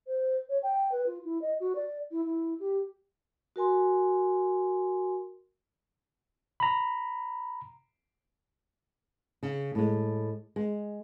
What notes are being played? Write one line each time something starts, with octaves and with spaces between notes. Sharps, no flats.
C5
C#5
G5
B4
F4
E4
D#5
F#4
D5
E4
E4
G4
F#4 A#4 G#5 C6
A#5 B5
C#3
A2 G#3
G#3